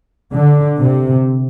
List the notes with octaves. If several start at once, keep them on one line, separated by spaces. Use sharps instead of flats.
D3
C3